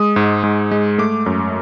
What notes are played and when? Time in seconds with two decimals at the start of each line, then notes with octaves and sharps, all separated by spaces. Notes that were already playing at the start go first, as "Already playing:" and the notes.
Already playing: G#3 D#6
0.16 G#2
0.44 G#2
0.71 G#3
0.98 A3 D6
1.26 F#2